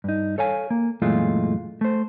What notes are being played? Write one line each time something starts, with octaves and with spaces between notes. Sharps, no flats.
G2 D#4
A4 C#5 F5 G#5
A#3
F#2 A#2 E3 G#3 A3 F4
A3 C5